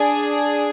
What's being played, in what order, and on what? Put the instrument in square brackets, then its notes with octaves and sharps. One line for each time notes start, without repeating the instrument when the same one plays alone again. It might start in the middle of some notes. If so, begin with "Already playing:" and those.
Already playing: [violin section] D4 G#4 G#5